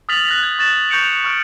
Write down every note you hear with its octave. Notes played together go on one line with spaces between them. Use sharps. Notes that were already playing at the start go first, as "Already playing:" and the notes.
D#6 F6 A6 B6 F7 F#7
F#6 A#6 F#7
G#6
C#6 F#6 A6 A#6 E7
C#6 G6 A#6 C#7 D7 F7
C#6 F6 D7